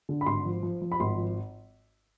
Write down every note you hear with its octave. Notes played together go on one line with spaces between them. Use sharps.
D3
B5
G#1 C6
F3
F3
F3
B5
G#1 C6
F3